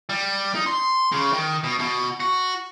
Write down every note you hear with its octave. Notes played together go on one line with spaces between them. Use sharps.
G3
D#4
C6
C#3
D#3
B2
B2
F#4